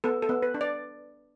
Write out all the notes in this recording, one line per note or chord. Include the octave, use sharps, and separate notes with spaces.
B3 A4
A4
B3
B4
D4
D5